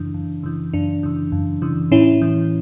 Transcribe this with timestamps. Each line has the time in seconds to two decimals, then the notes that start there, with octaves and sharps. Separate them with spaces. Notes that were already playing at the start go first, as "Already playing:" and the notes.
Already playing: F#2 C#3 E3 D4
0.14 F#2
0.43 C#3 E3
0.73 F#2 D4
1.03 C#3 E3
1.32 F#2
1.62 C#3 E3
1.91 A2 C#4 E4
2.22 E3